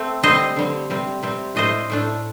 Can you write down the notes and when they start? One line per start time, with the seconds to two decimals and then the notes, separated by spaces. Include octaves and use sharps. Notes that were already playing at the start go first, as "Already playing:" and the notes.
Already playing: A3 C4
0.23 D3 G3 C4 C5 D#5
0.56 D3 G3 C4
0.90 C3 G3 C4
1.23 C3 G3 C4
1.55 A2 A3 D4 C5 D#5
1.90 A2 A3 D4